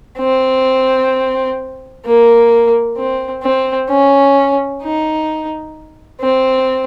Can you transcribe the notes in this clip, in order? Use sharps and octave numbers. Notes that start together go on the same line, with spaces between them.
C4
A#3
C4
C4
C#4
D#4
C4